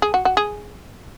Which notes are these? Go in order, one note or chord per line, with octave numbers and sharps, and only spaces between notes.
G#4
F#4
F#4
G#4